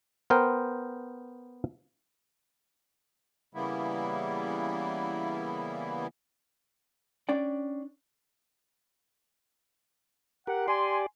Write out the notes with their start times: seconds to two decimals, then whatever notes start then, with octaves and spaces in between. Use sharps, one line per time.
0.30 B3 A#4 C5 G5
3.53 C#3 E3 G3 A#3 B3 E4
7.29 C#4 D4 D5 G5
10.47 G4 A#4 F#5
10.68 G4 D5 G#5 C6